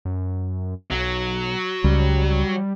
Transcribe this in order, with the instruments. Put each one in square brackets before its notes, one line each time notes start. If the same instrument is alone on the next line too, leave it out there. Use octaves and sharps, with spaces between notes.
[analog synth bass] F#2
[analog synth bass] B1 [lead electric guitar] F#3
[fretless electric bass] C#2 [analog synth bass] G3